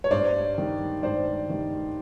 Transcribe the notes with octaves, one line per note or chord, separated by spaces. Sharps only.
C#5
G2 C5 D5
D#3 G3
G2 C5 D5
D#3 G3